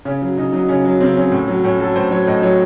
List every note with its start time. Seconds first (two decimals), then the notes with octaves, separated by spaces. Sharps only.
0.05 C#3 C#4
0.22 F#3
0.37 C#3 D#4
0.53 F#3 D#4
0.68 C#3 C#4
0.85 F#3
1.00 C#3 C4
1.16 F#3 C#4
1.32 A2
1.47 F#3
1.63 A2 C#4
1.79 F#3 A4
1.96 A2 C5
2.11 F#3 C#5
2.27 A2 D#5
2.42 F#3 C#5